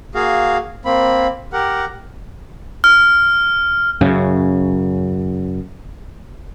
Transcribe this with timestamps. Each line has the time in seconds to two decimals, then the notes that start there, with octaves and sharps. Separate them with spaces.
0.15 A#3 F#4 G#4 F5
0.85 A#3 C4 B5
1.53 G4 A#4 F#5
2.84 F6
4.01 F#2 C#3